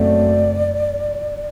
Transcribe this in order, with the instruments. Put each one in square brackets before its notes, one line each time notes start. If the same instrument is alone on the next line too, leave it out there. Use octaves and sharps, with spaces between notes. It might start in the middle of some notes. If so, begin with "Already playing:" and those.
Already playing: [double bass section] F#1 F#2 F#3 A3 C4 [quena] D5